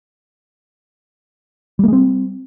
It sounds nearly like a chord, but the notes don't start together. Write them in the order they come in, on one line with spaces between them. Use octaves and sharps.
G3 A#3 G#3 C4